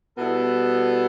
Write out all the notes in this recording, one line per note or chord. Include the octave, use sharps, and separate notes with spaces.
B2 G3 B3 E4 A4